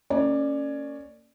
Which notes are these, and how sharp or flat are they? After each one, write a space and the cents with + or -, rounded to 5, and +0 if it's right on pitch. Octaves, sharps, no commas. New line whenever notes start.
A#3 -25 C#4 +0 D5 +15